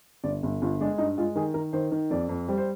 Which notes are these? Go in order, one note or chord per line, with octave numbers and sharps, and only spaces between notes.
G1 D5
G1
G1 F4
G#3 D4
G2 D#4
G#3 F4
D#3 G#4
D#3 A#4
D#3 C5
D#3
F2 D5
F2
G3 C5
C5